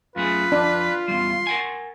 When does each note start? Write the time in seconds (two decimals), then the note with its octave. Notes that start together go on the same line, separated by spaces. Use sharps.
0.16 F#2 A3 F4 G#4 B4
0.52 F2 D4
1.08 E2 G3 C6
1.47 A#4 F#5 G#5